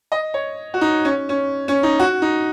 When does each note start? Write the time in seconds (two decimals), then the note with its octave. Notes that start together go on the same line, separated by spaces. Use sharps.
0.12 D#5
0.34 C#5
0.74 F#4
0.81 D#4
1.05 C#4
1.29 C#4
1.68 C#4
1.83 D#4
2.00 F#4
2.22 D#4